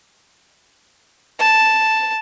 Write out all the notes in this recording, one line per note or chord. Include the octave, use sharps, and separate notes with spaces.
A5